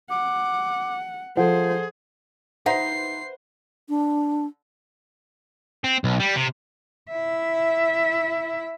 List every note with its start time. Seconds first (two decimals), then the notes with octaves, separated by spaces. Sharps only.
0.10 F#5 D6
1.37 F3 G#4 A4 C5 F#5
2.66 D#4 B4 C5 E5 F#5 C7
3.89 D4
5.84 C4
6.04 B1
6.20 G3
6.36 C3
7.11 E4 E5